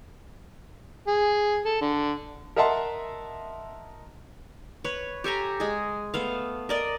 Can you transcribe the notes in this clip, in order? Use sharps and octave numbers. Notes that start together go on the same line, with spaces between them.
G#4
A4
D3
A#4 D#5 E5 F#5 A5 C6
B4 C#5
G4 A4 G#5 A#5
G#3 G#4
A3 B3 F5
A#4 D5 D#5